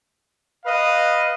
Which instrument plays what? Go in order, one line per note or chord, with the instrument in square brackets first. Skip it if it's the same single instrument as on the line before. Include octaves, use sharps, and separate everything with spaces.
[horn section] B4 D#5 F5